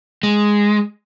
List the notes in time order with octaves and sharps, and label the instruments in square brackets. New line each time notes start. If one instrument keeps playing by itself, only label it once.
[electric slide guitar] G#3